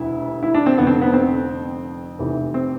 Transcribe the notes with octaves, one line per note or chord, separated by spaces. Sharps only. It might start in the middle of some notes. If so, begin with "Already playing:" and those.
Already playing: E1 D2 C3 E4
E4
D4
C4
F1 F2 D3 B3
C4
B3
C4
F1 E2 C3 E3
C4